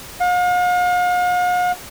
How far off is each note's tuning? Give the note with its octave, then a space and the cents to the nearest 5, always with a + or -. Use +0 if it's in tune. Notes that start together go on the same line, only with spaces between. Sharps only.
F5 +45